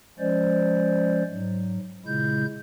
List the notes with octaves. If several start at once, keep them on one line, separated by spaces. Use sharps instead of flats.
F3 G#3 C#4 C5 D5
G#2 F#3
A#2 C#3 G#3 E4 G6